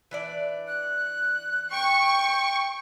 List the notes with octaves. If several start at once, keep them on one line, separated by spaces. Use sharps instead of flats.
E3 D4 D5
F#6
G5 C#6